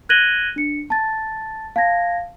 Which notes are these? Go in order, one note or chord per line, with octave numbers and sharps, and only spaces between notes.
F#6 G#6 A#6 D#7 F#7 G7
D4 C#7
A5 A6
F5 A5 G#6 A#6